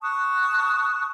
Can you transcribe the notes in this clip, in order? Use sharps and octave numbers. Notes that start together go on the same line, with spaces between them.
A5 C#6 D#6 F#6